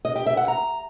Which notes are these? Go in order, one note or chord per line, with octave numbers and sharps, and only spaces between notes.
D#5
G4
E5
F#5
A#5